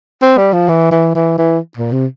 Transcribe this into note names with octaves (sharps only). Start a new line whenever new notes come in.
C4
G3
F3
E3
E3
E3
E3
A#2
C3